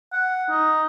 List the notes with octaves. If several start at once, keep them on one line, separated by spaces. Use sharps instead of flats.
F#5
D#4